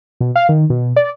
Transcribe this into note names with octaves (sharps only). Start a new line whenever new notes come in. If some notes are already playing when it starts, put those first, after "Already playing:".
B2
F5
D#3
B2
D5